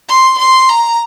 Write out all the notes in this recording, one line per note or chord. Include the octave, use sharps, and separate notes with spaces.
C6
C6
A#5